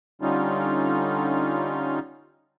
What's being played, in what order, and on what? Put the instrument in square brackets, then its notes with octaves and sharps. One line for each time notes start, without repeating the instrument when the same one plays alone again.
[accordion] D3 G3 C#4 D#4 F4